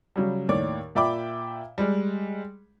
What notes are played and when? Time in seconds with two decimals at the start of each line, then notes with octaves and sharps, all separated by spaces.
0.16 C#3 F#3 G3
0.49 D#2 A2 C#5 D5 D6
0.95 A#2 D5 E5 G5 B5 D6
1.78 G3 G#3